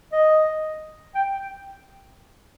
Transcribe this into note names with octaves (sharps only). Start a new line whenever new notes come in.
D#5
G5